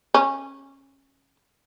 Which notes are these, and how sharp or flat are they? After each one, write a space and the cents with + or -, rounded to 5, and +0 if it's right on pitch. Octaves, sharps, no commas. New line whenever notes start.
C#4 -20